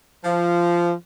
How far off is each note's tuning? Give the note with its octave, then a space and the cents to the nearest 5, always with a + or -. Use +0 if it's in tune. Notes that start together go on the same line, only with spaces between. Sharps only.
F3 -15